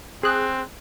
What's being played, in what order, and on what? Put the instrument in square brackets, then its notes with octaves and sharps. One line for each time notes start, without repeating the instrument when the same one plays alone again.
[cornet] C4 [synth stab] G#4 F#6